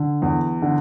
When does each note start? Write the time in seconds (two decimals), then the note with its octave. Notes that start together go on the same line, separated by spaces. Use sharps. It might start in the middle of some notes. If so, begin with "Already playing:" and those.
Already playing: D3
0.22 E2
0.62 D3